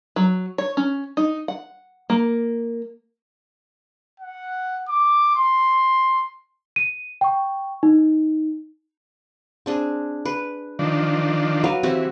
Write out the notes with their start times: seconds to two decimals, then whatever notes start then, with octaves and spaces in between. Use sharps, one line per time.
0.16 F#3
0.58 C#5
0.77 C#4
1.17 D#4
1.48 F#5
2.10 A#3
4.20 F#5
4.89 D6
5.36 C6
6.76 D#7
7.21 G5 C#6
7.83 D#4
9.66 C4 D4 G#4
10.25 B4
10.79 D#3 F3 D4
11.64 F#3 B4 F5
11.83 E3 C4 F#4 G4